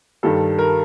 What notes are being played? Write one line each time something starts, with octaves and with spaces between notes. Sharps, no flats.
G2 D#3 G3 A4
A#4